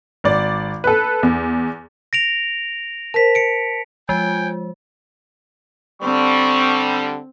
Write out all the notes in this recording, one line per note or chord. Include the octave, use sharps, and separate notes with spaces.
G#1 D5
A4 B4
E2
A#6 D7 F7
A#4 C5 A5 B6
C#7 D7
F3 G#3 G5 G#5
D3 G3 C4 C#6